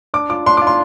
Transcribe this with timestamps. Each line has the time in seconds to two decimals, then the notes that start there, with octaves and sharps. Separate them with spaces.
0.14 D4 D6
0.30 F4 D6
0.46 D4 C6
0.57 F4 D6
0.67 C6